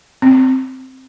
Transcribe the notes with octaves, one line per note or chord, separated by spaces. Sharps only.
C4